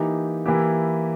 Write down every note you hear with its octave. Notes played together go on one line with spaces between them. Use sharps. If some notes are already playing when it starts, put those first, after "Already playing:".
Already playing: E3 A#3 D#4 G4
E3 A#3 E4 G4